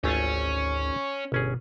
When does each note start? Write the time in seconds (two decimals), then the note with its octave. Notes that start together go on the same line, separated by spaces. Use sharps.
0.04 G#1 D2 A3 C#4 F4
1.32 G1 B2 C#4 G#4